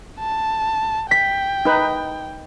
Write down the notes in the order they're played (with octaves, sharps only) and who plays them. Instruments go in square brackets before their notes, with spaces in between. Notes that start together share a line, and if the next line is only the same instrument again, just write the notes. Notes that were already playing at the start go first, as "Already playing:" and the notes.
[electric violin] A5
[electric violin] G5 [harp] B6
[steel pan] D#4 B4